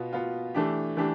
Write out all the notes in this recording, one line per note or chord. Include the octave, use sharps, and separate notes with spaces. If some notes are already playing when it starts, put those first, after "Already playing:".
Already playing: B2 B3 F4
B2 B3 F4
E3 A3 D4 G4
E3 A3 D4 G4